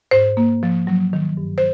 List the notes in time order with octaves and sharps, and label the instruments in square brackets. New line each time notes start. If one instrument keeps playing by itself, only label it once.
[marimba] G#2 C5
A#3
F3
F#3
D#3
G2
C5